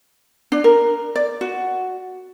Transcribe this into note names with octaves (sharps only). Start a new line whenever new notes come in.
D4
A#4
D5
F#4